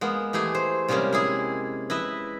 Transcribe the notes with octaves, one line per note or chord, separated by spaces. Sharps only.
G#3 A#3 B3
E3 A3 G4 G#4
C5
C3 G3 G#3 A#3 C#4
G#3 E4 G#4
E4 B4 D#5 E5